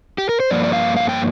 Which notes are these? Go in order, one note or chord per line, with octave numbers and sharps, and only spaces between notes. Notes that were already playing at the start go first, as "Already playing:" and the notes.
G4
A#4
C5
G2 F3 A#3 D5
D5
F5
F5
G5